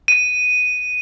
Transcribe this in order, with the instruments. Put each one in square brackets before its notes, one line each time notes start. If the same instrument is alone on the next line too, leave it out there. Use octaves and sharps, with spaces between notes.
[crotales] D#7